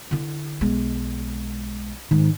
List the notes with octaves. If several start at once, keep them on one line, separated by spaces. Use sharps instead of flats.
D3 E4
B1 G#3
G#2 D#3